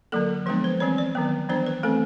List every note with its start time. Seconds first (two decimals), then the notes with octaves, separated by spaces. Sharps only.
0.12 D3 F#3 A#3 A4
0.46 F3 G#3 B3 D4 B4
0.64 C5
0.80 E3 G3 C4 C#5
0.98 D5
1.15 D#3 F#3 B3
1.49 E3 G3 B3 D4 C5
1.66 B4
1.83 E3 A3 C4 A4